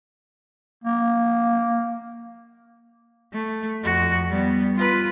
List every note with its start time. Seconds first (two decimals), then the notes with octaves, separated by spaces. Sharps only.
0.84 A#3
3.33 A3
3.83 F2 F#4
4.29 G3 B3
4.76 F4 B4